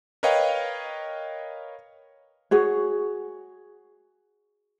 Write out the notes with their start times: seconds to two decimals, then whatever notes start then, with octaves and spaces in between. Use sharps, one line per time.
0.23 A#4 B4 C#5 D#5 F5 G5
2.51 F#4 G#4 C#5